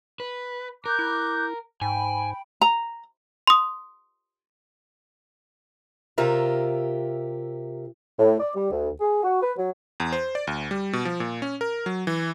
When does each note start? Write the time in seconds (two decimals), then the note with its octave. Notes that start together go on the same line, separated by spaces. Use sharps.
0.20 B4
0.86 A#4 D6 F#6 G6
0.99 E4
1.81 G#2 G5 G#5 B5
2.62 A#5
3.47 C6 D#6
6.18 C3 F4 G4 A#4 E5
8.19 A2
8.40 D5
8.55 G3
8.71 D2
9.01 G#4
9.24 F#4
9.42 B4
9.58 F#3
10.00 E2
10.12 C5
10.35 D5
10.47 D2
10.71 G3
10.93 B2
11.05 F3
11.20 A#2
11.42 C#4
11.61 A#4
11.86 F#3
12.07 E3